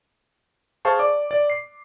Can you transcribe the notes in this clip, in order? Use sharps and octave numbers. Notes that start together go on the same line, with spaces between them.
G#4 C5 F5 A5 C#6
D5 D6
D5
C7